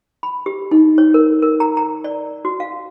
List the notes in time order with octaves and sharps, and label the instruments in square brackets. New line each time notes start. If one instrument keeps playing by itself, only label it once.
[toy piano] B5
G4
D#4
C#5
A#4
A#4
A#5
A#5
D5
F#4
F5